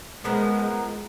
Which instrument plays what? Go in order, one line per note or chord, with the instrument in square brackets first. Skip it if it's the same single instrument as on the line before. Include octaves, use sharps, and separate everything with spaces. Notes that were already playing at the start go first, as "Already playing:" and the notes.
[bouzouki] F3 B3 A#4 [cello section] G#3